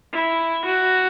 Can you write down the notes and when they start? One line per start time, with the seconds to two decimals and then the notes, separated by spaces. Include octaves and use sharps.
0.13 E4
0.65 F#4